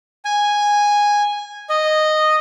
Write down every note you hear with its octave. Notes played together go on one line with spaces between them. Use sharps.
G#5
D#5